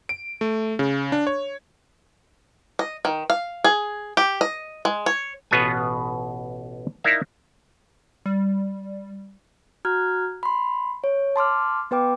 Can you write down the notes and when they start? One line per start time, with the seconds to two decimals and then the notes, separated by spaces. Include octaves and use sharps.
0.09 D7
0.41 A3
0.79 C#3
1.12 D4
1.27 C#5
2.79 D#5
3.05 D#3
3.30 F5
3.64 G#4
4.17 G4
4.41 D#5
4.85 G#3
5.06 C#5
5.51 A1 B2 B3 F4 F#4 G#5
7.04 D#4 E4 A#4 D5 E5 F5
8.26 G3
9.85 F#4 A#5 F6 F#6 G#6
10.43 B5 C6
11.04 C#5
11.36 A5 C6 D6 F6
11.91 B3 B4 G5 D6